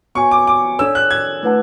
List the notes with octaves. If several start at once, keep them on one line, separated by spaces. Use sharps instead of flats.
B3 F#4 C#5 G#5 C#6
D6
D6
D4 A4 C#5 E6
F#6
G#6
A3 E4 B4 F#5 A5